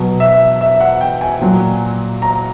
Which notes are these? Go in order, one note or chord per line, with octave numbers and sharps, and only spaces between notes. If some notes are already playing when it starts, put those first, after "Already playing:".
Already playing: B2 F#3
E5
E5
F#5
G5
G#5
A#2 F#3
A#5